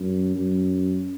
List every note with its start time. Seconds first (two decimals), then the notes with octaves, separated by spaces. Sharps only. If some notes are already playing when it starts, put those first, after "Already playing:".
Already playing: F#2
0.35 F#2